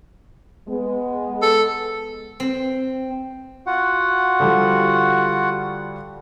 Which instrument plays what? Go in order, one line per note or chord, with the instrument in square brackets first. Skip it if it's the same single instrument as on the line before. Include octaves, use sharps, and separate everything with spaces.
[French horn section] G#3 B3
[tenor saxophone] A4
[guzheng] C4
[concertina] F4 F#4 F#5
[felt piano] D3 F3 G3